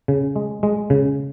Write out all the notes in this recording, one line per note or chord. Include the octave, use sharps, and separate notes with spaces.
C#3
G#3
G#3
C#3